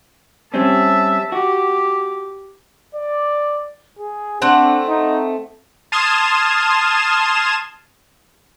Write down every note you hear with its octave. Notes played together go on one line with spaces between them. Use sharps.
G3 C4 C#4 E5 A5
F#4 G4
D5
G#4
A3 C4 D4 F#5
D#4
A5 C6 D#6 F6 G#6 E7